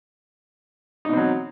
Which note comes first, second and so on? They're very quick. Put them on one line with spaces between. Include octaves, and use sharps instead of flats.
D#4 B2 C4 F#3